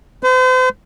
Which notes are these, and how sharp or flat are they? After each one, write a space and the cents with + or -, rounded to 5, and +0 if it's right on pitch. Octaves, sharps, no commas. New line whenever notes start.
C5 -40